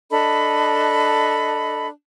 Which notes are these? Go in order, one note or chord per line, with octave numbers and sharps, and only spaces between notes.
D4 A4 D#5 B5